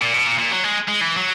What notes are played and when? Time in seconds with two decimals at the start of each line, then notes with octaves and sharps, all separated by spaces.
0.02 A#2
0.14 B2
0.27 A#2
0.39 A#2
0.51 F#3
0.64 G#3
0.89 G#3
1.01 E3
1.17 F#3